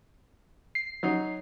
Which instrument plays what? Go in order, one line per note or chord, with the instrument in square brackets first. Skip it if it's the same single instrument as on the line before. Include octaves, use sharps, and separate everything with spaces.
[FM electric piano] C7
[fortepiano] F#3 D#4